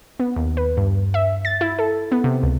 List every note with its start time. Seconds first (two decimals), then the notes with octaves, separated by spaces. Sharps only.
0.20 B3
0.36 D#2
0.57 B4
0.77 G2
1.14 E5
1.45 A6
1.61 E4
1.79 A4
2.12 B3
2.24 C3
2.43 C#2